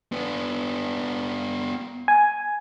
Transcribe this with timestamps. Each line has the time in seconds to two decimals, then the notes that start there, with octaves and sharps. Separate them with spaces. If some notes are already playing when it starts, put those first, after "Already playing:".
0.12 B3 D4
2.08 G#5